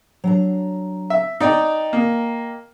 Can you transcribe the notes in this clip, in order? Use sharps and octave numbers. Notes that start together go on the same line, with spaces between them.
F#3 D4 A#5
E5
D#4 D5 D#5 G5 A#5
A#3